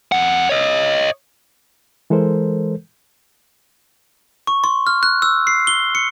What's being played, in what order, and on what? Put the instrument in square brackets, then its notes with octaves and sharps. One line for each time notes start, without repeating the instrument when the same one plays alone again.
[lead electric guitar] F2 F#5
C#5 D#5
[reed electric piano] E3 G#3 A4 A#4 C5
[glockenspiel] C#6
C6
F6
F#6
E6
C7
G7
C#7